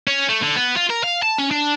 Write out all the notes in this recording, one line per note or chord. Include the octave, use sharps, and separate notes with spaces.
C#4
A3
D3
B3
F4
A#4
F5
A5
C#4
D4